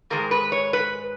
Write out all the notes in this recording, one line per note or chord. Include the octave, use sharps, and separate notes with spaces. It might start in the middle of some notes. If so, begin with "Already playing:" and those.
G#2 D#3 G#3 A#4
B4
C#5
B4